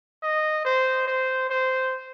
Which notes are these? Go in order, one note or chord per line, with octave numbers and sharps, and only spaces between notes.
D#5
C5
C5
C5